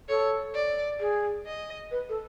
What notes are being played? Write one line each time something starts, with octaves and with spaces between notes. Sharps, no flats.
A4 C#5
D5
G#4
D#5
B4
A4